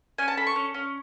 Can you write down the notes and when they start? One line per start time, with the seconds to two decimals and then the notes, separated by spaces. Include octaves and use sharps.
0.18 C#4 G#5
0.28 A5
0.37 A4 B5
0.47 C#6
0.56 C#4
0.74 C#4